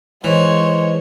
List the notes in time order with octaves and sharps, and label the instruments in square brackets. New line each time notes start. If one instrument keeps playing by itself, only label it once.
[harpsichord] E3 [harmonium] G#3 [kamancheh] C5 C#5